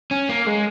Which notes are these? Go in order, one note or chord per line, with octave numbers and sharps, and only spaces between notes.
C#4
A#3
G#3